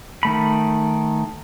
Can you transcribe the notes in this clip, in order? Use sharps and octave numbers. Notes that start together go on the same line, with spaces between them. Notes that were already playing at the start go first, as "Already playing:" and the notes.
D#3 A3 B5